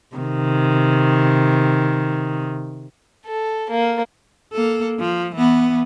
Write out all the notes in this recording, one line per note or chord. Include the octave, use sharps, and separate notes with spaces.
C3 D#3
A4
A#3
A#3 A4
F3
E3 B3